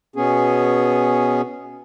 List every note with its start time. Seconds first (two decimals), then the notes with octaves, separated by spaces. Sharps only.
0.16 B2 B3 C#4 G#4